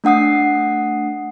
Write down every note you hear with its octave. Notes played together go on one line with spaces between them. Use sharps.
A3 D4 F#5 D#6 C7